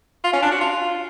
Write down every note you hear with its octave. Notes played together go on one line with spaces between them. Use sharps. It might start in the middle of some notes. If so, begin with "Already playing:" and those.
F4
C#4
D4
F#4
F4